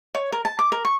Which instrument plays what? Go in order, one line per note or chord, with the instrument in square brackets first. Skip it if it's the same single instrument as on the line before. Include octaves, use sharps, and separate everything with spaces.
[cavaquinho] C#5
A#4
A5
D6
A#4
C#6